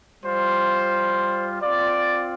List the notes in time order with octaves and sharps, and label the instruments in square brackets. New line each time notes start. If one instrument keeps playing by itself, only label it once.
[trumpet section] G3 F4 C5
C4 F4 D5